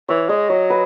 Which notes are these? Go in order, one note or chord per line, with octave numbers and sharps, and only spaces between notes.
E3 C#5
G#3 D#5
F#3 C#5
B4